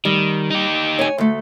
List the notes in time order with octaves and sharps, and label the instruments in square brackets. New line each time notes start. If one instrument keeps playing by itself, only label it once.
[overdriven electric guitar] D#3 [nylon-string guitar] G3
[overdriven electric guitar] D#4 G4
[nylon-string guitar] C#5 G#5
D2 A3